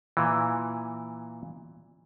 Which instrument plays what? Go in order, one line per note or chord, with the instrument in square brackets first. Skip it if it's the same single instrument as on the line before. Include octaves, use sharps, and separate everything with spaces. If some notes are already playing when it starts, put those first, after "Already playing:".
[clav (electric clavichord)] A#2 E3